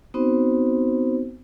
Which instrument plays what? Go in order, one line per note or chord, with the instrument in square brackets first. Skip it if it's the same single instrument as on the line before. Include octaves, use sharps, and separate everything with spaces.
[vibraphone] B3 C4 D#4 F#4 C5